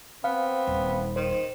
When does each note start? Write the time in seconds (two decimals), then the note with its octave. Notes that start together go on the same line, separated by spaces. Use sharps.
0.24 B3 C4 F5
0.67 D#1
1.16 D#3 C5